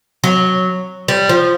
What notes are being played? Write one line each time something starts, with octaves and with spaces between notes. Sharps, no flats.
F#3
G3
F3